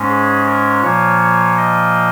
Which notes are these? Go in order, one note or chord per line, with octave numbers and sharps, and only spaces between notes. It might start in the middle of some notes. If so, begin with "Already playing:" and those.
Already playing: G#2 G#3 C#4
G#4
A#4
A#2 F3 A#3 C#5
C#5
D#5